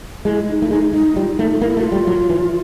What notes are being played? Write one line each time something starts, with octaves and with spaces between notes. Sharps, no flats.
G#3 E4
D#4
A3
E4
G#3 D#4
G#3 D#4
G3 F4
A3 D#4
A#3 E4
A3
F#4
F4
G3
F#3
E3